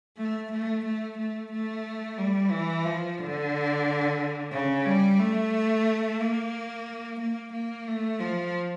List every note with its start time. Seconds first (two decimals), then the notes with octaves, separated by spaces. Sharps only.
0.18 A3
0.51 A3
0.85 A3
1.18 A3
1.51 A3
2.18 G3
2.51 E3
2.85 F3
3.19 D3
4.52 C#3
4.85 G3
5.20 A3
6.20 A#3
7.20 A#3
7.53 A#3
7.87 A3
8.20 F3